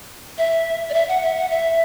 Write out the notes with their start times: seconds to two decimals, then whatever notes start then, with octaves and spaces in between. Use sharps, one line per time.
0.38 E5
0.90 D5
0.94 E5
1.08 F#5
1.23 E5
1.36 F#5
1.50 E5